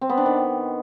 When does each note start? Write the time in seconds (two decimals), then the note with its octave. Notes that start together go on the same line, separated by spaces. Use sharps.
0.01 C4
0.10 B3
0.18 D4
0.26 D#3